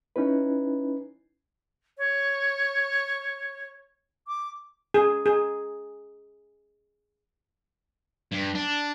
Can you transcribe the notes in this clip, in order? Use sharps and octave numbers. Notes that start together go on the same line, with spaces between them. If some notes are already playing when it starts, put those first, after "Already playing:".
C#4 D#4 E4 B4
C#5
D6
G#4
G#4
G2
D4